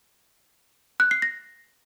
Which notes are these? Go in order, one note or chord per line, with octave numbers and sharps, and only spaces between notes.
F#6
C7
A#6